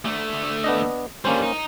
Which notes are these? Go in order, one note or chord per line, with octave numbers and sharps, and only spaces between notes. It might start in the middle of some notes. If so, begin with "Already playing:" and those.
D2 A3
B3 D4 D#5
D3 G3 A#3 C#4 C5
D#4